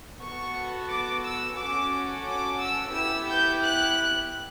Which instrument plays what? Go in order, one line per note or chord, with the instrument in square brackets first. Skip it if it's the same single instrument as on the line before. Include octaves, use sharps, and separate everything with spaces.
[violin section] B3 F#4 A4 C#6
D6
E6
C#4 F#4 A4 D6
D6
E6
B3 E4 G4 E6
G6
F#6